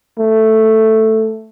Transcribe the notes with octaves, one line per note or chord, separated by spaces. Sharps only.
A3